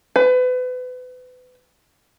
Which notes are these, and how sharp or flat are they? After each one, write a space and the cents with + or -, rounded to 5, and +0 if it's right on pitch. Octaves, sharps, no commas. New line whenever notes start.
B4 +35